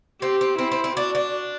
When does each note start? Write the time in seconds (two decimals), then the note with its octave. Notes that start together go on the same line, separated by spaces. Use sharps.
0.22 C4 G4
0.41 C4
0.58 C4 E4
0.71 C4
0.84 C4
0.96 D4 F#4
1.15 D4